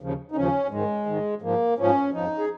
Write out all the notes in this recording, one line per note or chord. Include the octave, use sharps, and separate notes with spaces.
D#2 C#3 F3
D#4
D#2 C#3 F3 C#4
G#2 D#3 G#3
G#2 D#3
G#2 F3 A#3
G#2 F3 C#4
F2 F3 D#4
G#4